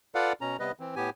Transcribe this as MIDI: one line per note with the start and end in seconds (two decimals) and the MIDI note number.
0.15 0.33 65
0.15 0.33 69
0.15 0.33 71
0.15 0.33 74
0.15 0.33 77
0.15 0.33 78
0.41 0.57 47
0.41 0.57 61
0.41 0.57 82
0.59 0.72 48
0.59 0.72 55
0.59 0.72 59
0.59 0.72 71
0.59 0.72 75
0.80 0.95 52
0.80 0.95 60
0.96 1.10 45
0.96 1.10 59
0.96 1.10 67
0.96 1.10 80